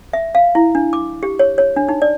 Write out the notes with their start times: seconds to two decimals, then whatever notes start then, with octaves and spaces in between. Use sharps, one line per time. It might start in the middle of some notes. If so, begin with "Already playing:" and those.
0.13 E5
0.35 F5
0.55 E4
0.75 D4
0.93 D6
1.23 G4
1.39 C#5
1.58 C#5
1.76 D4
1.89 D#4
2.02 D5